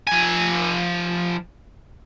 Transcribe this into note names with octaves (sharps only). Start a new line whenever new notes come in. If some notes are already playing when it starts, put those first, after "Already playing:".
F3 G#5